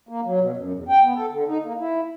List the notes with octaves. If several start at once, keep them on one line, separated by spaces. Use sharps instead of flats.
A#3
F#3
B2
F#2
E2
G5
B3
A4
D3
D#4
A#3
E4